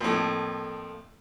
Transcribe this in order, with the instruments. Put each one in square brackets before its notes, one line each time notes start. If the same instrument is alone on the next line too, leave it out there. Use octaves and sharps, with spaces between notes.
[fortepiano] F2 A2 [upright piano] A3 A#3